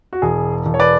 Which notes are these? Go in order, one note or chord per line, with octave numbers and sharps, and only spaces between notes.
F#4
E1 G#4
E1
C#5
B4 D5